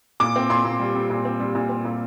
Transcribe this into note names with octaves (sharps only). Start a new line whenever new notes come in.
A#2 D6
C4
A#2 C6
A#2
G3
G3
A#2
C4
G3
A#2
C4
A#2